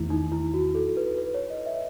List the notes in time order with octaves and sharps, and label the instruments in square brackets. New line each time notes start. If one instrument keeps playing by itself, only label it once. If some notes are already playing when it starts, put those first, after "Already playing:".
Already playing: [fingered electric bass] E2 D#3 A3 [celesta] E4
[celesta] D#4
E4
F#4
A4
B4
B4
C#5
D#5
E5